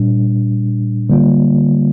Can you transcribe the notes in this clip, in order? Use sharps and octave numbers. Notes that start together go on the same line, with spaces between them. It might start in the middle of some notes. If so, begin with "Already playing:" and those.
Already playing: A#2 G3 D4
D3 G3 A#3 F4